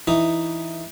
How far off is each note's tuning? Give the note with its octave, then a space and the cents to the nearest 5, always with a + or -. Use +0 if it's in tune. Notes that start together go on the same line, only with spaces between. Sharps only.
E3 +0 D#4 +0